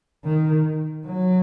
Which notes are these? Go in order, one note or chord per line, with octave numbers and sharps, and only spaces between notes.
D#3
F#3